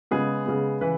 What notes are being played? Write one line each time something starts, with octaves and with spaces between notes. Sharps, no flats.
C#3 G#3 B3 G#4
C#3 G#3 B3
C#3 E3 B4